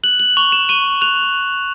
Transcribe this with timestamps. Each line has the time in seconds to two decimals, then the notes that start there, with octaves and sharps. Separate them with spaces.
0.03 F#6 F#7
0.20 F#7
0.37 C#6 F7
0.52 E7
0.69 C#6 D#7
1.01 F#6 F7